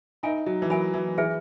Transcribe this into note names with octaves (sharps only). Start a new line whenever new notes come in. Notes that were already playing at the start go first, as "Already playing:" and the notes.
D#4 A#4 E5 G#5 B5
F#3
E3
F#3 A#4 E5 G#5 B5
E3
E3 G#4 B4 E5 G#5